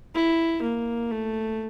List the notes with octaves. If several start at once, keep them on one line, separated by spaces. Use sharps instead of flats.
E4
A#3
A3